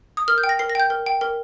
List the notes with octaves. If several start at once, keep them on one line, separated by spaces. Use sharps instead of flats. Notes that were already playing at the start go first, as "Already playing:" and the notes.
D#6
A#4 F6
G6
G5
A#6
A#4 C7
A#6
G5 G6
A#4
G5
A#4